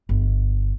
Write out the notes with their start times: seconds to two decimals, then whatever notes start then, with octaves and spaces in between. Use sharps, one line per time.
0.09 G1